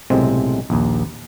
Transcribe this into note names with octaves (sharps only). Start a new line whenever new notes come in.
B1 A2 C3 G#3 C4
A#1 D#2